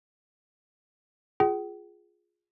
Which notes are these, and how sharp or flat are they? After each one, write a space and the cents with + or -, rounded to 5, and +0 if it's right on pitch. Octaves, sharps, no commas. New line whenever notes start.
F4 +0 G#4 +0 G5 -45